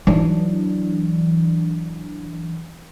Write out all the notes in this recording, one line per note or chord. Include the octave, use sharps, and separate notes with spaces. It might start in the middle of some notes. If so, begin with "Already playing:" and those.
E3 F#3 D4 D#4